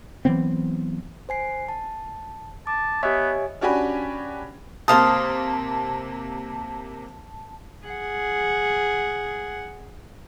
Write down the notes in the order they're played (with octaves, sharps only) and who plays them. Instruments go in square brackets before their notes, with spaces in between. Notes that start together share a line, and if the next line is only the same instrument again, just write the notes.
[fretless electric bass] E3 F#3 B3 C4
[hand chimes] C5 G#5 C7
A5
[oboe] A5 [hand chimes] D6
[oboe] B3 [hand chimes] G4 D#5 G#5 [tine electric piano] C#5 E5
[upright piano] C#4 D4 F#4 G4 G#5 B5
[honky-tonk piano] C3 A#3 [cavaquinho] C5 F5 D#6 [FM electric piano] A5
[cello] G#4 F#5